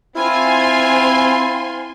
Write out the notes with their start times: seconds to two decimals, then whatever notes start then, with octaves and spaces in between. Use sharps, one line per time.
0.16 C4 E4 F4 G#5 C6